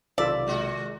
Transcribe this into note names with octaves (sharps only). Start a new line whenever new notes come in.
B1 C3 D#3 F4 A4 D5 E5
A#2 G#3 F#4